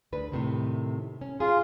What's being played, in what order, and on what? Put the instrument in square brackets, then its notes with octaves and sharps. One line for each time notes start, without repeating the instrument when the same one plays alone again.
[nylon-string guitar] D2 D4 B4
A2 C3 D#3
C#4
[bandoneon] F4 [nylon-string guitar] G#4